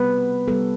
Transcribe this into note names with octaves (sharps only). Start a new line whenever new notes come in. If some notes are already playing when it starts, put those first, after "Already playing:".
Already playing: C3 G3 B3 B4
C3 G3 B3 A4